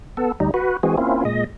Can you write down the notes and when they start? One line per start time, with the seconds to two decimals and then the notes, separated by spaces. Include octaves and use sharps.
0.17 B3 A4
0.40 D2 G3 D#4
0.54 F#4 B4
0.83 E3 G#3 C4 F#4 G#4
0.97 A#3 C4 C#4 E4 F4
1.25 A#2 G#3 D#5